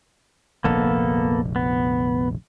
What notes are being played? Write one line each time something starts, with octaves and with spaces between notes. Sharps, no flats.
F1 A#1 D3 A#3 B3 A4
B3